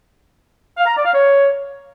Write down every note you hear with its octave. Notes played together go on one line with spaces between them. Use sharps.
F5
A#5
D5
F5
C#5